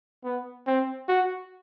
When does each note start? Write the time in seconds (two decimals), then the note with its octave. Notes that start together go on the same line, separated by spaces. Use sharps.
0.24 B3
0.67 C4
1.08 F#4